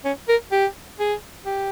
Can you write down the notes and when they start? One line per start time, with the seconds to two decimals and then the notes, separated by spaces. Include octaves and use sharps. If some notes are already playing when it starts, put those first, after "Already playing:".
0.05 C#4
0.29 A#4
0.52 G4
1.00 G#4
1.45 G4